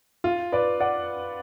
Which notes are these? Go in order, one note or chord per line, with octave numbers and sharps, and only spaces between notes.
F4
B4 D5
D5 F#5